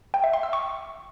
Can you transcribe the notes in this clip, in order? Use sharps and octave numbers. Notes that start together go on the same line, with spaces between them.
G5
E5
C6
E6
C#6